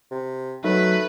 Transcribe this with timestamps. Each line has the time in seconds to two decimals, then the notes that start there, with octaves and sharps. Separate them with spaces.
0.11 C3
0.64 F#3 A3 D#4 B4